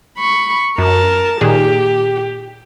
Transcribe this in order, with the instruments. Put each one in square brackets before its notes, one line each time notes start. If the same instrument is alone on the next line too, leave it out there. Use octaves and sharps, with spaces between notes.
[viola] B5 C#6
[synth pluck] F#2 [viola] A#4 A5
[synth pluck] A#2 D#3 G#4 [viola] G4